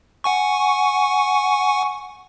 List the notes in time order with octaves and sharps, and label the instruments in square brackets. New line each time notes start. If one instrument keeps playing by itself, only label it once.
[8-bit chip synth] F#5 G#5 C#6